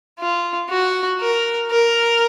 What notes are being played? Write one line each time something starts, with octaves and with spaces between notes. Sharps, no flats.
F4
F#4
A#4
A#4